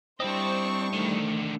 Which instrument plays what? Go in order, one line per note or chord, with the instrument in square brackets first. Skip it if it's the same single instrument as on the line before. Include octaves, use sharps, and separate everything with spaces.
[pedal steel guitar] G3 E4 D#5 [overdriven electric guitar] C4 [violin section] D4 C5 C#6
[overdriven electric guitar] D3 D#3 [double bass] A3